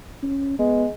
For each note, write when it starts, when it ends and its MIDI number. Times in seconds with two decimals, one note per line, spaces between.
0.22 0.54 61
0.59 0.91 56
0.59 0.85 59